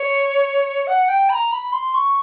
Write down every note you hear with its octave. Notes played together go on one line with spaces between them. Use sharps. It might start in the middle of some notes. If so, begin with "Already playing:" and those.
Already playing: C#5
F#5
G5
B5
A#5
B5
C6
C#6